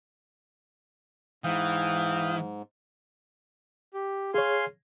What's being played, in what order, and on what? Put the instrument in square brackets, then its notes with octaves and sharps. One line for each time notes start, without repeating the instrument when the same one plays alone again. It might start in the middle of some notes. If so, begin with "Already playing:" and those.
[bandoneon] G#2 [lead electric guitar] E3 [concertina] F5 G5 D#6
[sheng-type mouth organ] G4
[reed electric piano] G#4 C#5 [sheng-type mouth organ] F5 G#5 C6